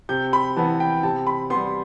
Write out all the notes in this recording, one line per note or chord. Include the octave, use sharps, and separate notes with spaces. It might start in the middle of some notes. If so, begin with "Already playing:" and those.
C3 G6
B5
E3 B3 A5
G5
C3 A5
B5
B3 C6
G3